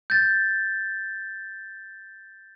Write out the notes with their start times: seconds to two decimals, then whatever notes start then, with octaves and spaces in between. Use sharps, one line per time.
0.10 G6 A6